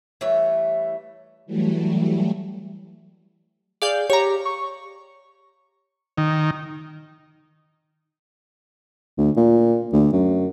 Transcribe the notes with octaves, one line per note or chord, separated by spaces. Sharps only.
E3 G3 A3 C#5
E3 F#3 G3 A3
G#4 D5 F5 G6
G4 C#5 A#5
C#6
D#3
D2
A#2
D2
F#2